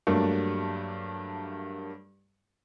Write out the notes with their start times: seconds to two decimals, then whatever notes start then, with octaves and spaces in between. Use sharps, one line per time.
0.07 G2 F#3 A3 A#3 D4